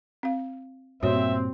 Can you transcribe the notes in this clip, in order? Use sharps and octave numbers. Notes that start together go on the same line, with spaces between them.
C4 F5
G2 A#2 C4 F#4 C#5 E5